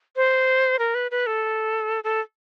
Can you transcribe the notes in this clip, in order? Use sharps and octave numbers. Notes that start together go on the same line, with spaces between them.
C5
A#4
B4
B4
A4
A4